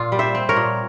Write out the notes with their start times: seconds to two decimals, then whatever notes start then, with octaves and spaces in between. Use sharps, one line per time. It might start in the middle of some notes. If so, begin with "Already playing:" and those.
Already playing: A#2 F4
0.12 G3
0.19 C5 E5
0.35 C4
0.49 A#4 C#5
0.56 A#2